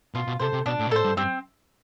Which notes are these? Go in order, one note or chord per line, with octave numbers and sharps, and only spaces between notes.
B2 F4
B2
C3 A4 C5
C3
B2 D4
A2
B2
A2 A4 C5
G2
G2 C4